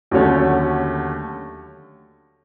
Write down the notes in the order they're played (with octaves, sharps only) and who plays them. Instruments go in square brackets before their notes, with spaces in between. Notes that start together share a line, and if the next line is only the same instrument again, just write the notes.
[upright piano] D#2 D3 F#3 A3 C#4